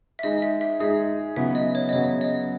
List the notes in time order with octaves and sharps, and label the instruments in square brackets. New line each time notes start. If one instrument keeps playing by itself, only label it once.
[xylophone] E5
[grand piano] G#3 D#4 G#4 [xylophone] D#5
[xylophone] E5
E5
[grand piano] G#3 D#4 G#4 [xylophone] D#5
[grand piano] C#3 F#3 B3 [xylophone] E5
[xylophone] D#5
C#5
D#5
[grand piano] C#3 F#3 B3 [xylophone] C#5
[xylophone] D#5